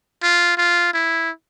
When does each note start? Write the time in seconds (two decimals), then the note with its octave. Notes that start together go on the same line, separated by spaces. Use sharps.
0.23 F4
0.58 F4
0.93 E4